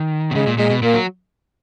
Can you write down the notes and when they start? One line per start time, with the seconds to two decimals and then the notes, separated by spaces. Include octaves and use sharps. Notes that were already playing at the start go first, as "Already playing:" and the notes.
Already playing: D#3
0.31 B2
0.35 C#3 G#3
0.47 A#2
0.58 A#2 G#3
0.70 B2
0.82 A#2 A#3
0.94 F#3